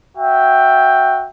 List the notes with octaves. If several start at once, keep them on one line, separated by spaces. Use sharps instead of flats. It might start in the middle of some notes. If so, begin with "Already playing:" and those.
F#4 E5 G5